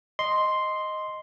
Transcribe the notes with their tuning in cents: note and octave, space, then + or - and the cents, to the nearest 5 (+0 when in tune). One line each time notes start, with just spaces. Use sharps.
D#5 +0 C6 +0